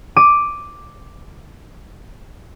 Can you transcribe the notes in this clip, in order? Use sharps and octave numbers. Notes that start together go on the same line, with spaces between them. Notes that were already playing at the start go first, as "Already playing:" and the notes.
D6 D#7